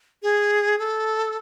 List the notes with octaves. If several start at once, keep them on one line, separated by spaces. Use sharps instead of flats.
G#4
A4